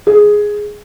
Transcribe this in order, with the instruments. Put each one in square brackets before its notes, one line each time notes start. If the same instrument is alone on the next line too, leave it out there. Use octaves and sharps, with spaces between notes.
[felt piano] G#4